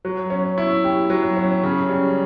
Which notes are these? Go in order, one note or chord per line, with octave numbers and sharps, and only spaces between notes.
F#3
C#4
E4
G4
F#3
C#4
C#3
G3